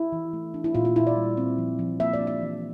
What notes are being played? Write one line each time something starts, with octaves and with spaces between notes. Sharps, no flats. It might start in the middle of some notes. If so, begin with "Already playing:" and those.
Already playing: E4
E3
A3
D4
E4
A#2 F4
F4
A#2 E4
D5
G3
C4
F3
F3
A#3 E5
D5
D4
E5
E3